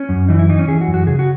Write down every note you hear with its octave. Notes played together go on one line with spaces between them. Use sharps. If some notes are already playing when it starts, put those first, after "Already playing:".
Already playing: C#4
F#2
E3 D#4
E4
E3 D#4
C#4
E3 G#4
F#4
F#2
F#4
C#3 G#4
F#4